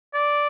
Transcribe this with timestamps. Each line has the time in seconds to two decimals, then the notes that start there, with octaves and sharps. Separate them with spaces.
0.14 D5